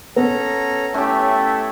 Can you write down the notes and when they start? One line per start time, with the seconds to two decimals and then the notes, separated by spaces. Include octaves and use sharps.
0.16 B3 C#4 A4 A#5
0.94 A3 C#4 E4 G4